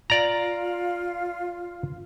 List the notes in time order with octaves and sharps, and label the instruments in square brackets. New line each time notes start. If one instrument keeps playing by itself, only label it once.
[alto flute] F4 [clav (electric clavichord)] D5 A#5